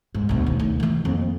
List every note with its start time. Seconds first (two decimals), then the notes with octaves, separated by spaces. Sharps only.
0.14 G#2
0.29 D2 B2
0.47 D#2
0.59 D2
0.80 D#3 E3
1.05 F2 A#3